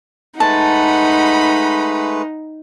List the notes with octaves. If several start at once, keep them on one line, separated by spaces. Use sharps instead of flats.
G#3 A3 D#4 B4 F#5 A5 B5